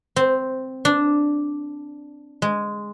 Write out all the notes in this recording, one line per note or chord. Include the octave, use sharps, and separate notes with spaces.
C4
D4
G#3